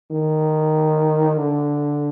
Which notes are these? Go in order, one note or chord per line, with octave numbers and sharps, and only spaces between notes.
D#3
D3